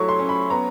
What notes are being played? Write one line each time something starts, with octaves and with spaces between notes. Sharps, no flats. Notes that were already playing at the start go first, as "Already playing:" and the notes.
Already playing: F#3 A3 E4 C#6
C6
C#4
B5
B3 A#5